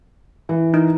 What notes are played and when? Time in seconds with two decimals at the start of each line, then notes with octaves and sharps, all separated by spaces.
0.49 E3
0.74 D#4